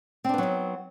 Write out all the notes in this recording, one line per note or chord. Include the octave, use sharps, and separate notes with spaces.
F#3 B3 C4 D4 D#4